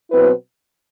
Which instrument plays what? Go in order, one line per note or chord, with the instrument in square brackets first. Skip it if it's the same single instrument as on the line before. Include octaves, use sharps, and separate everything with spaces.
[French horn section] B2 F#3 C4 E4 B4